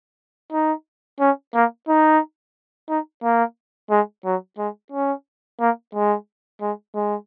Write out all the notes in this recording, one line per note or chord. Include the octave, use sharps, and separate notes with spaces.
D#4
C#4
A#3
D#4
D#4
A#3
G#3
F#3
G#3
C#4
A#3
G#3
G#3
G#3